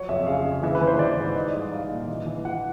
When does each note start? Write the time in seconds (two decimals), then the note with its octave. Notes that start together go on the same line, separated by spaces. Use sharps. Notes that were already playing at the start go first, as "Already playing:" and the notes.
Already playing: F3 F#3 C#5
0.09 F2 E5
0.27 C#3 F5
0.45 C#3
0.63 E3 E5
0.75 B4
0.81 E3
0.87 C5
0.99 E3 D5
1.18 G#2
1.36 D#4 D#5
1.47 D5
1.54 G3 D#5
1.72 D#4 F5
1.91 A#2
2.08 E3
2.27 E3
2.45 E3 F#5